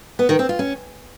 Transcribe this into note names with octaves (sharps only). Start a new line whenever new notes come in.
B3
D#3
C4
F4
C#4